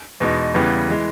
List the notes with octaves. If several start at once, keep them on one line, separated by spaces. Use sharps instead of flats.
E2 B2 G#3 D#4
E2 C#3 E3 G3 B3
E3 G#3